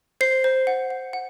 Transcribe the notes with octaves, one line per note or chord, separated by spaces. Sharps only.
C5 C7
C5
F#5
F#5
F#5